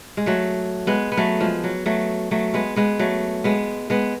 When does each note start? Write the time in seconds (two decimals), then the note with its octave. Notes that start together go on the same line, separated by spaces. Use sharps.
0.17 G#3
0.26 F#3 A3
0.87 G#3 B3
1.12 B3
1.17 F#3 A3
1.40 F3 G#3
1.64 F#3
1.86 F#3 A3
2.31 F#3 A3
2.54 G#3 B3
2.76 G#3 B3
2.99 F#3 A3
3.44 G#3 B3
3.90 G#3 B3